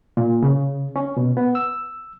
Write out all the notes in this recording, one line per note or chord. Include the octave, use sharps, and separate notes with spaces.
A#2
C#3
C#4
B2
B3
E6